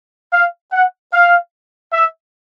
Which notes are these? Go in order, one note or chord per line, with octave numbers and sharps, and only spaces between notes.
F5
F#5
F5
E5